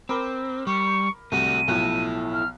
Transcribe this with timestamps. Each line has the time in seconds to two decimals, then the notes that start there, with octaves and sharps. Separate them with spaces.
0.09 C4 A#4 B5 D6
0.67 G3 C#6
1.32 C2 A3 F#4 D#7
1.68 B1 F3 E4 A4 F#6
2.33 F6